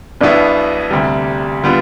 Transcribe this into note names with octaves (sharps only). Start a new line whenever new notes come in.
B1 B2 B3 D4 E4
D2 C3 G3
D3 G3 B3 F4